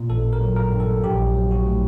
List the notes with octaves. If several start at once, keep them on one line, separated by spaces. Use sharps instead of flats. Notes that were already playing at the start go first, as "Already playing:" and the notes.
Already playing: A#2
A1 A4
A#4
F#3
A#4
G2
A4
A#1 G4
F#3
F#4
A2